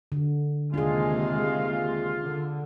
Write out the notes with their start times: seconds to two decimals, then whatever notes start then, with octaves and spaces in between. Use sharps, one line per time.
0.12 D3
0.74 D#2 C3 G#3 D4 F4 G#4
2.21 D3